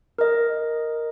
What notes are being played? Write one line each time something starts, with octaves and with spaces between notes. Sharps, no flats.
A#4 D#5